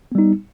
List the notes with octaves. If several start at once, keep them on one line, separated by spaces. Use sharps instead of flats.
G3 B3 D#4